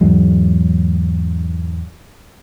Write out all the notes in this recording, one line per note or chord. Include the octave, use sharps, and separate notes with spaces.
E2 G#2 F#3 G#3